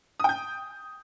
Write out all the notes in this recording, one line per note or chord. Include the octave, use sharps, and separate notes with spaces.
G5 D#6 G6